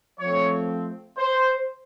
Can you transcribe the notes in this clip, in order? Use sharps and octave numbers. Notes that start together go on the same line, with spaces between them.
F3 A3 C4 C#5
C5